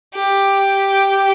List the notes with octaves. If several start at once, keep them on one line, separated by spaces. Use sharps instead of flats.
G4